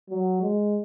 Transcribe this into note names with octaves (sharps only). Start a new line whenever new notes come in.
F#3
G#3